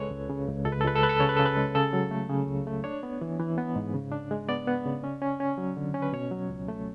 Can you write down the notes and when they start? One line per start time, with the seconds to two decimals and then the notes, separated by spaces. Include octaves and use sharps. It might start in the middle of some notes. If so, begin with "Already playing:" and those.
Already playing: C#2 C#3 G#3 A4 B4 C#5
0.10 C#2
0.30 C#3
0.48 C#2
0.65 C#2 A4
0.72 B4
0.81 A4
0.84 C#2 B4
0.96 A4
1.02 C#3 B4
1.09 A4
1.20 C#3 C#5
1.29 B4
1.37 C#3 A4
1.46 B4
1.57 G#3
1.75 C#3 A4
1.93 F#3
2.11 A3
2.30 C#3
2.48 C#2
2.67 A3
2.84 D4 C#5
3.03 B3
3.21 E3
3.40 E3
3.58 B3
3.76 G#2
3.94 C#3
4.12 D4
4.31 G#3
4.49 B3 D5
4.67 B3
4.86 C#3
5.04 C#4
5.22 C#4
5.40 C#4
5.58 F#3
5.77 D3
5.94 C#4
6.02 B4
6.13 B2 C#5
6.31 F#3
6.50 C#2
6.68 A3